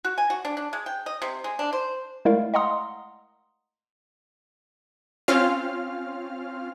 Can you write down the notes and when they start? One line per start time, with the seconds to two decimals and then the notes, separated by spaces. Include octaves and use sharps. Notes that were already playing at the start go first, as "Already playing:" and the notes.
0.05 F#4
0.18 G#5
0.30 F#4
0.45 D4
0.57 D4
0.73 G#3
0.86 G5
1.06 D#5
1.22 C3
1.44 G#3
1.59 D4
1.73 C5
2.25 G#3 A3 E4 A#4 D5 F5
2.54 D#5 F5 F#5 A#5 C6 D#6
5.28 C4 C#4 F4 F5 F6